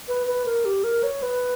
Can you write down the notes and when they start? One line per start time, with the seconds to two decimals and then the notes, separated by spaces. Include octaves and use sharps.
0.08 B4
0.27 B4
0.46 A#4
0.65 G4
0.84 A#4
1.03 C#5
1.23 B4